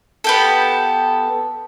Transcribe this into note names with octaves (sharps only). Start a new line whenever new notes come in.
B3 G4 A4